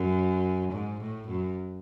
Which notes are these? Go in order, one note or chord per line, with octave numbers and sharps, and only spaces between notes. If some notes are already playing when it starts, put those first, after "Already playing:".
Already playing: F#2
G#2
A2
F#2